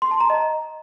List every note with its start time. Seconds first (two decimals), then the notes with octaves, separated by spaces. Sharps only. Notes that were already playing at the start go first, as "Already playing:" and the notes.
0.02 C6
0.11 A5
0.20 A#5
0.30 D#5